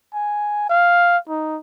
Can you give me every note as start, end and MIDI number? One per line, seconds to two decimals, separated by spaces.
0.14 0.64 80
0.69 1.17 77
1.29 1.57 63